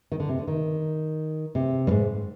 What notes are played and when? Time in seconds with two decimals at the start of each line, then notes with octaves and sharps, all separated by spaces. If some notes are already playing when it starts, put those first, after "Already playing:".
0.12 D#3
0.20 D3
0.29 C3
0.39 D3
0.47 D#3
1.55 C3
1.87 G2
1.91 G#2